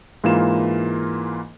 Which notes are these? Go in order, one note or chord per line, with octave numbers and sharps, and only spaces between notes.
G#2 E3 A#3 F4 E7